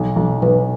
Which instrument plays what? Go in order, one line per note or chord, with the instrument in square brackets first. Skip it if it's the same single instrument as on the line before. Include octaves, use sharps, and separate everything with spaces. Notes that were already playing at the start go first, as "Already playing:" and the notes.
Already playing: [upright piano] B1
B1
[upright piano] B1 [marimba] B4